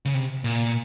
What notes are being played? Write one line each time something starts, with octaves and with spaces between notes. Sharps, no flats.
C#3
C3
A#2